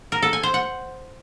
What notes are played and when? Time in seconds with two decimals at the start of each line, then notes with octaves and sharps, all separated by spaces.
0.12 A#4
0.22 A4
0.33 G#5
0.43 C5
0.54 F#5